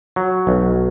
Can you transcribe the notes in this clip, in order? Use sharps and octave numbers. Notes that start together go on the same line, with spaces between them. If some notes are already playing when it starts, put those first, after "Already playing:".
F#3
B1